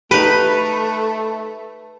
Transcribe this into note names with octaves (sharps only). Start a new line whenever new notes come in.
A3 D#4 G4 B4